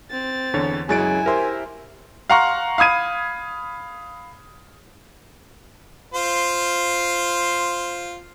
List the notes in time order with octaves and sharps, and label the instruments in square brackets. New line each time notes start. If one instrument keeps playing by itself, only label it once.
[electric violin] C4 A6
[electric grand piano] E2 D3 C#5
[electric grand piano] F#2 A6 D7 [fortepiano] C#3 F#3 G#3 [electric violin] E4 [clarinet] G#5
[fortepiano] G4 C5 [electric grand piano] A#4 E5
[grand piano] F5 F#5 A#5 C6 C#6 F6
F5 B5 D#6 G#6 D#7
[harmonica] F4 C5